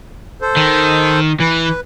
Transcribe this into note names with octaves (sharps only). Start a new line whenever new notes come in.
A4 C5
D#3
E3 B4